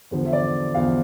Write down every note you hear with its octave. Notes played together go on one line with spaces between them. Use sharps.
E2 D3 F3
E5
D5
E2 D3 F3 F5